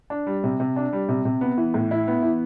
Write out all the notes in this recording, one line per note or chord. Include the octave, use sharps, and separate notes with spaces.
D4
G3
C3
C3
D4
G3
C3
C3
B3
E3
A2
E4
B3
E3